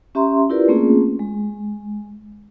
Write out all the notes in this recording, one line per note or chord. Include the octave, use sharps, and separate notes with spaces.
C#4 G4 E5 A#5 C6
E4 F4 G4 A#4 B4 D5
A3 A#3 C4 C#4 F4 G#4
G#3